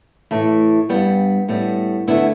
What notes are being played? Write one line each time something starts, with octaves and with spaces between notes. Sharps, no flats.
A2 E3 A3
G2 G3 B3
A2 G3 B3
D2 D3 A3 B3 E4